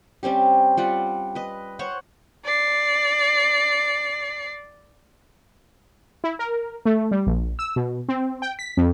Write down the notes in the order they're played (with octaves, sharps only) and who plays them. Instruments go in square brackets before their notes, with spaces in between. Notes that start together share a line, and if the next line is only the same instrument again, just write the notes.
[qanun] G3 C4 C#4 G4
G3 F4 F#5
B4 D#5
C5 C#5 F#5 C#6
[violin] D5 C7
[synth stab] E4
A#4
A3
G3
A#1
E6
B2
C4
G5
B6
F2